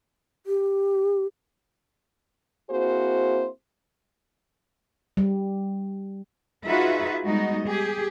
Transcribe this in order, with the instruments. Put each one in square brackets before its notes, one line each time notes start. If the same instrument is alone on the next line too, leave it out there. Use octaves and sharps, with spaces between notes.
[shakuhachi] G4
[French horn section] A#3 C4 E4 F#4 G#4 C5
[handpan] G3
[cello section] D#4 F4 F#4 G#4 B4 E5
G3 G#3 B3 D#4 F#4 D#5
G4 G#4